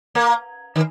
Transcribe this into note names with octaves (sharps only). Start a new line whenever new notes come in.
A#3
D#3